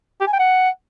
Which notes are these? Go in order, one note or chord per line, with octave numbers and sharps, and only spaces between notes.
G4
G#5
G5
F#5